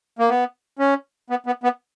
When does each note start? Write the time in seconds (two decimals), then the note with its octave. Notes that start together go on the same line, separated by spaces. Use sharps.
0.19 A#3
0.29 B3
0.79 C#4
1.30 B3
1.46 B3
1.63 B3